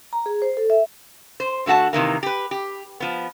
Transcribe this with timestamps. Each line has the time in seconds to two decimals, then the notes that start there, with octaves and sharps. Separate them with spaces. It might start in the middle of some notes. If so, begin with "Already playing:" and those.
0.13 A#5
0.26 G#4
0.42 C5
0.57 A4
0.70 E5
1.40 C5
1.66 D3 A3 F#4 F#5 A5
1.93 C3 D#3 E3 A#3
2.23 G4 B4
2.51 G4
3.00 F3 B3